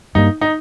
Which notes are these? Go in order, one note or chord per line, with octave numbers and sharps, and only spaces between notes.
G2 G3 A#3 D#4
D#4